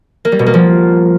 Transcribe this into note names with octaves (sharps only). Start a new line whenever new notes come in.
A#3
G3
B2
A#3
F3